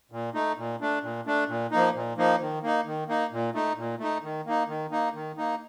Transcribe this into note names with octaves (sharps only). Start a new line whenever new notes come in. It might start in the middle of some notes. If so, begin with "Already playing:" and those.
A#2
A3 D#4
A#2
A3 D4
A#2
A3 D4
A#2
F3 A#3 D#4
A#2
F3 A#3 D#4
D#3
A#3 D#4
D#3
A#3 D#4
A#2
A3 D#4
A#2
A3 D#4
D#3
A#3 D#4
D#3
A#3 D#4
D#3
A#3 D#4